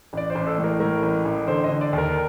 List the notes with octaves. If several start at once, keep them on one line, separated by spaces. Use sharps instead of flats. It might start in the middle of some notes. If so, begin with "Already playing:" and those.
A1 D5
C5
A1
A4
A2
A#4
A2 A#4
A1
A1
D3 C5
D#5
D3
D5
D#2
A#4